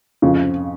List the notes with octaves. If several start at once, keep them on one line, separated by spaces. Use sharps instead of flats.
F2 C#3 F3